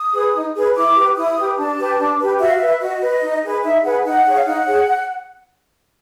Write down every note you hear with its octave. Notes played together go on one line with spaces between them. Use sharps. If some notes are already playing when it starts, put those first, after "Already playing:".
Already playing: D#6
G#4 B4
D#4
G#4 B4
E4 D6
G4 B4
E4 D#6
G4 B4
D4 A5
G4 B4
D4
G4 B4
F#4 E5
F5
B4 E5
F#4 D#5
B4
D#4
G#4 B4
D#4 E5
G#4 B4 F#5
D#4 F#5
G#4 C#5
F5
D#4 F#5
G#4 C#5